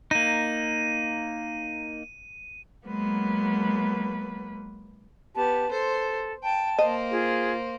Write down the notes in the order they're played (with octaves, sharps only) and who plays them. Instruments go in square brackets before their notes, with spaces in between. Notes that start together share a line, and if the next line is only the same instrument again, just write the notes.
[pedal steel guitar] A#3 D#4 [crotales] D#7
[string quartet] F#3 G#3 A#3 B3 B4
[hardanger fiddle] B3 [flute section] G4 A5
[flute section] A4 [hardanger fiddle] C5
[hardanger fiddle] G5 [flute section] A5
[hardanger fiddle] A#3 C5 [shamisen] D#5
[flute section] F4 G#4